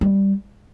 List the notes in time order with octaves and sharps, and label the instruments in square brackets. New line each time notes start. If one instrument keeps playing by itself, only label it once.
[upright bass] G3